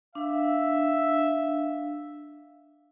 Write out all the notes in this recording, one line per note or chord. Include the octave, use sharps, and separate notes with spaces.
D4 E5 F5